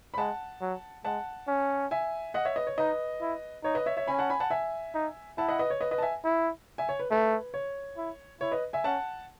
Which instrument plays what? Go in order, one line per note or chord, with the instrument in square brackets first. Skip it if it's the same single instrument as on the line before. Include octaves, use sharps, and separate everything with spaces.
[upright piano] B5
[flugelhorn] G#3 [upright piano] F#5 A5
[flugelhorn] F#3
[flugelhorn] G#3 [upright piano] F#5 A5
[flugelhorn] C#4
[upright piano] E5 G#5
D#5 F#5
C#5 E5
B4 D#5
C#5
[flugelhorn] D#4 [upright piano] B4 D#5
[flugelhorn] E4
[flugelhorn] D#4 [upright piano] C#5
[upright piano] B4 D#5
C#5 E5
C#5 E5
[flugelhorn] C#4 [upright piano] G#5 B5
[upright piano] F#5 A5
G#5 B5
F#5 A5
E5 G#5
[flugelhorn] D#4
[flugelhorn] E4 [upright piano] F#5 A5
[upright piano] D#5 F#5
B4 D#5
C#5
B4 D#5
B4 D#5
A5
E5 G#5
[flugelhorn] E4
[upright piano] E5 G#5
C#5
B4
[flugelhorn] A3 [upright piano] B4
[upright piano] C#5
[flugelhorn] E4
[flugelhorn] E4 [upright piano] C#5
[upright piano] B4 D#5
E5 G#5
[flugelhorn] C#4 [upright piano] F#5 A5